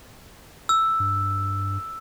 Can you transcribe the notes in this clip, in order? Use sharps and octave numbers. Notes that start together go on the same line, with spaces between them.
E6
G2